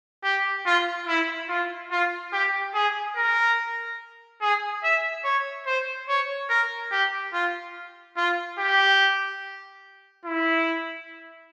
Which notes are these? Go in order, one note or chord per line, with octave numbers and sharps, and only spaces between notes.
G4
F4
E4
F4
F4
G4
G#4
A#4
G#4
E5
C#5
C5
C#5
A#4
G4
F4
F4
G4
E4